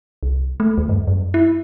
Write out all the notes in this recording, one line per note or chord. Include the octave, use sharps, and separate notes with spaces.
C2
A3
D#2
G2
F#2
E4